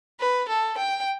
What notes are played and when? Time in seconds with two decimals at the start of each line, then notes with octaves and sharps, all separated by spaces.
0.20 B4
0.49 A4
0.78 G5